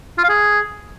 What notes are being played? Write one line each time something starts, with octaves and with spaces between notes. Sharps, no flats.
F4
F5
G#4